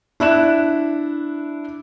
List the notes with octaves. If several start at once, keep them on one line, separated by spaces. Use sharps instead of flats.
D4 E4 F#6 E7